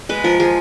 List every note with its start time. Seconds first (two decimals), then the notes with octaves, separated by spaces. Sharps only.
0.09 G#3 B4
0.24 F3 A#4
0.40 F3 G#4